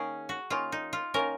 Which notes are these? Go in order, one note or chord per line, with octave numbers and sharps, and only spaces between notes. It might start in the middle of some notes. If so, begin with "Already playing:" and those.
Already playing: D#3 A#3 C#4 G#4
F#4
D#3 A#3 C#4 F4
D#4
F4
D#3 A#3 C#4 A#4